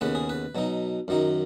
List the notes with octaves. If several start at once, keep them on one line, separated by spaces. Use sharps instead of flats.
D#2 C#3 B3 B4
G#4
B4
B2 F#3 D#4
F#2 D#3 F#3 D#4